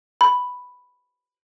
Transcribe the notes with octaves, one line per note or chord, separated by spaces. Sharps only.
B5